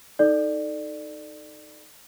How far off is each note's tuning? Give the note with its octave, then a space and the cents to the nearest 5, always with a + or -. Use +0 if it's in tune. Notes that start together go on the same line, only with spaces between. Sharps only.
D#4 +0 A4 +0 D5 +20